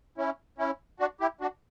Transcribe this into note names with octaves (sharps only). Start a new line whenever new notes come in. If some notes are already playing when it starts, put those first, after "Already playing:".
C#4 E4
C#4 E4
D4 F#4
E4 G4
D4 F#4